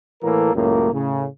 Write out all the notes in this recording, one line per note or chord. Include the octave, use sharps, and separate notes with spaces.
A2 E3 A#3 A4 A#4
C#2 F#2 A2 A#3
A2 C#3